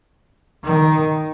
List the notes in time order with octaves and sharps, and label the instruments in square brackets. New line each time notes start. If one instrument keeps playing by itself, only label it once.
[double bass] D#3